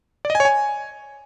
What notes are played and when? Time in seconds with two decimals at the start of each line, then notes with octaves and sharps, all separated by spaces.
0.25 D5
0.30 D#5
0.35 G#5
0.40 C#5
0.45 G#5